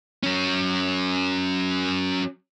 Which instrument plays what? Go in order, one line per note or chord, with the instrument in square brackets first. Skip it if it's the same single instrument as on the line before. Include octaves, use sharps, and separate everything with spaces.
[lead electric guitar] F#3 C#4